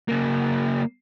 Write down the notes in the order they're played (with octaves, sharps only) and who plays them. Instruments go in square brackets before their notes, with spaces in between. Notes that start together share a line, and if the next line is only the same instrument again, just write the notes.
[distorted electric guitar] C#3 A#3